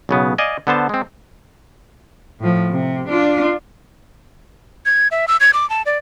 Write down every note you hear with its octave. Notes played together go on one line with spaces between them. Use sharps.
B1 C#3 B3
D5 D#5 F5 G#5
D3 B3 C5 A5
G#3 C4
A2 F3
C3
D4 F4
G#6
E5
E6
G#6
D6
A5
D5